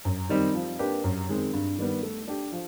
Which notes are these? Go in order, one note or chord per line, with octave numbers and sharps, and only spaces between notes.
F#2
D#3 G3 C4 D#4
F3
A#3 D4 G4 B4
F#2
D#3 G#3 C4
G2
D#3 G3 B3
A3
D4 G4
F3